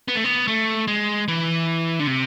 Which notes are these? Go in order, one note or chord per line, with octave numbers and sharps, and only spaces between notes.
B3
A3
B3
A3
G#3
E3
D3
C3